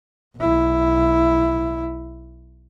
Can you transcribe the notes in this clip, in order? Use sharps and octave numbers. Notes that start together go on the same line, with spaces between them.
B1 E4